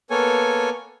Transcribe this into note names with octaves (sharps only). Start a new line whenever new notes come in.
A#3 B3 A4 C#5 G#5